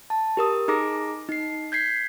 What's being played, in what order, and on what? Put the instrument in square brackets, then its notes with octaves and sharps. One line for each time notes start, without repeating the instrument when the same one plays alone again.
[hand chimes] A5
G4 A#4 D#6
D#4 G#4 A#5 D6 A#6
D#4 C7
G6 G#6 B6 C7